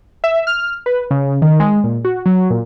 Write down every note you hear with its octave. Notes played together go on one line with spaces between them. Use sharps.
E5
F6
B4
C#3
D#3
G#3
A#2
F#4
F#3
A#2